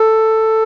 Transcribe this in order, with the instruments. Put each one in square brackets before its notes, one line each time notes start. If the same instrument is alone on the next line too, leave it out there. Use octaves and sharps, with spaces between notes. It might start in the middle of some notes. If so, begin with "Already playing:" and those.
Already playing: [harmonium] A4